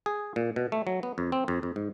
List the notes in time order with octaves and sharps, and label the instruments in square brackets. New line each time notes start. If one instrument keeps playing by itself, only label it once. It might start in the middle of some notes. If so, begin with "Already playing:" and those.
[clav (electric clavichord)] G#4
A#2
B2
A3
F#3
B3
F2
C4
F2
F2
G#2